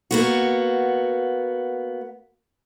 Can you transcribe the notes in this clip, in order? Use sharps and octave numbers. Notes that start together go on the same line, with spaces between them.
A#3 B3 F#4